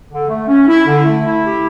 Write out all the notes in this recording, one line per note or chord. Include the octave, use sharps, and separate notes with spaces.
D3
A3
C#4
E4
D3
A3
E4
G4